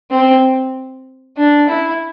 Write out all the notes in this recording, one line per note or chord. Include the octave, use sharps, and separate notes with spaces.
C4
D4
E4